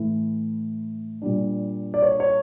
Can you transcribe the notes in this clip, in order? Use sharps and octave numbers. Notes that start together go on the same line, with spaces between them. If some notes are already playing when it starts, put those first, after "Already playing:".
Already playing: A2 E3 A3 E4
A#2 G3 D4
D5
C#5
C#5